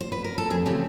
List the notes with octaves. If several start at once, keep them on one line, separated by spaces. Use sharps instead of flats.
C5
B4
A#4
A4
F2 G#4
C#3 E3 A3 C4 G4